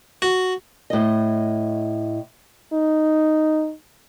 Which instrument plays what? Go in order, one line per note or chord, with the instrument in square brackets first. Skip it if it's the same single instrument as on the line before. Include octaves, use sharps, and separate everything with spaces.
[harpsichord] F#4
[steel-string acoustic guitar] A2 D#5
[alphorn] D#4